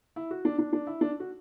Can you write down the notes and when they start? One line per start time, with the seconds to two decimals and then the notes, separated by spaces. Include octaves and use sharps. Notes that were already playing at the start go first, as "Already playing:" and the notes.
0.16 E4
0.31 F#4
0.45 D4
0.59 D4
0.73 D4
0.87 E4
1.01 D4
1.20 F#4